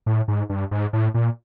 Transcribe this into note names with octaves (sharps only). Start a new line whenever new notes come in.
A2
G#2
G2
G#2
A2
A#2